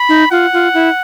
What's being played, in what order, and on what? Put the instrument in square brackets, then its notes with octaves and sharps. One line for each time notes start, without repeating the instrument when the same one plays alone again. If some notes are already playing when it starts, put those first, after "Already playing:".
Already playing: [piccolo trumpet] B5
[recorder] D#4
[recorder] F4 [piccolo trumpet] F#5
[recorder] F4
E4